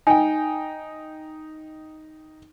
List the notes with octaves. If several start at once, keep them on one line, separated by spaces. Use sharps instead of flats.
D#4 G5 G#5